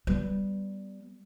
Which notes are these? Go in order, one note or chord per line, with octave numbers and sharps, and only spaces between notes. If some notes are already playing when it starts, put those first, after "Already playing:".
G3 B3